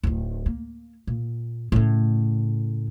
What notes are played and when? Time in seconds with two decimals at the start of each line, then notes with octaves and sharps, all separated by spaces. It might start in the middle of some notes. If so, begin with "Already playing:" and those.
0.03 D1 D#4
0.46 A#3
1.07 A#2
1.72 A2 C#3